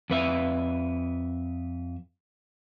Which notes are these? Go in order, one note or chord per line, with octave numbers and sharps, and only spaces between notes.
F2 B4 E5